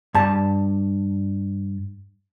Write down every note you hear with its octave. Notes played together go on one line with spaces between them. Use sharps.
G2 A5